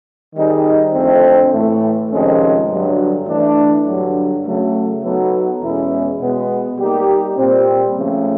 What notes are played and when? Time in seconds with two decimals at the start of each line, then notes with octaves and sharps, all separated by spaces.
0.36 D#3 G3 C4 D#4 G#4
0.94 F2 D3 F3 A3 C4
1.52 A2 E3 A3
2.11 F2 C3 D#3 G#3 C#4
2.70 G2 D3 F#3
3.28 E3 A3 D4
3.87 G2 D3 F#3
4.45 C#3 F#3 A3
5.04 F#3 B3 D#4 F#4 A4
5.62 E2 B2 G#3 C#4 E4
6.20 B2 G#3 B3
6.79 G3 A#3 D#4 G4
7.38 A#2 G3 C4
7.96 C#3 F3 A3